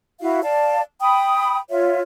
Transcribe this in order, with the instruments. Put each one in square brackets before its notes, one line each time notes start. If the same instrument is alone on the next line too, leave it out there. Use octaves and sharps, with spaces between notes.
[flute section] E4 F#4 E5 F5
D5 F5 A5
G5 B5 D#6
F4 C#5 E5